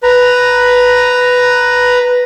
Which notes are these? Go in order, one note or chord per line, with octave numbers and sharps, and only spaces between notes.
B4 A#5